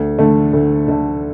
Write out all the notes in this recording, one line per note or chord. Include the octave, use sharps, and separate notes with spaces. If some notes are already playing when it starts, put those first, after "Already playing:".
Already playing: D2
D3 A3
D2
D3 A3